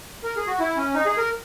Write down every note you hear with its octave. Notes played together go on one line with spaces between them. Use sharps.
A#4
G#4
F#4
E4
C#4
D#4
G#4
A#4